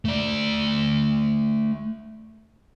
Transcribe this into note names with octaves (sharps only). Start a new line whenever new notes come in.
A3 D5